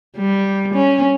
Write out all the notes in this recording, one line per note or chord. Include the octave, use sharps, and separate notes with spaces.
G3
C#4